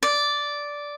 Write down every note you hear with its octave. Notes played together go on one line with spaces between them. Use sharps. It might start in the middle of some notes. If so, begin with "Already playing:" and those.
D5